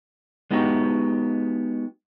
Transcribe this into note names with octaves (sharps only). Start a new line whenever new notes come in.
G#3 B3 D#4 F#4 G4